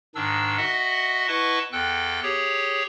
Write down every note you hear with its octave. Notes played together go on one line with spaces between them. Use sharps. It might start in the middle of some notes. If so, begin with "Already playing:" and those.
G#2 D#3 D4 E6
F#4 D#5 E5 F#5
E4 B4 D#5 F#5 A5 C#6
E2 A4 G5 F#6
G4 G#4 C#5